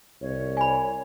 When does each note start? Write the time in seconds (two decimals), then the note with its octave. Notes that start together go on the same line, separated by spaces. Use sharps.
0.22 C2 C#5
0.57 G#5 B5